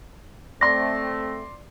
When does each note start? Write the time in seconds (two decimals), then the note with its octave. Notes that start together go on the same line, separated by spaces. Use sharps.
0.61 A3 C4 D5 C6 A#6